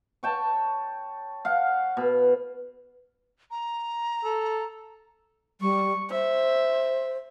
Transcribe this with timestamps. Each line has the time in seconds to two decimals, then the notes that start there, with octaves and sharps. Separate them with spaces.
0.23 C#5 G5 A5
1.45 F5 F#5
1.97 B2
3.51 A#5
4.24 A4
5.61 G3 C#6
6.11 C5 E5